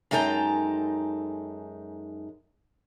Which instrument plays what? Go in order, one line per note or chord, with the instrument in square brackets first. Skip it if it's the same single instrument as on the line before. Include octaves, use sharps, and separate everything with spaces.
[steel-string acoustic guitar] F#2 G#3 D#4 A4 G5 A#5